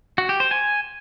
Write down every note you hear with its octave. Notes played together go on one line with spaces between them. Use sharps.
F#4
G4
C5
G#5